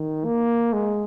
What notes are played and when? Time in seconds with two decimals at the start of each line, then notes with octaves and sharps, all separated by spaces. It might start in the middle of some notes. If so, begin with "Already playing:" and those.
Already playing: D#3
0.25 A#3
0.73 G#3